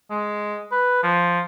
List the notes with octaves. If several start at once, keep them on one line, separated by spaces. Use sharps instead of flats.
G#3
B4
F3